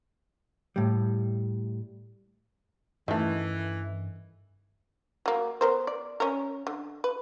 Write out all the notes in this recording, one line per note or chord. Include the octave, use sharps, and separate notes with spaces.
A2 G3
G2 D#3 E3 A3 C#4
F#3 A#3
B3 A#4 C5
D5
C#4 A#4
D3
B4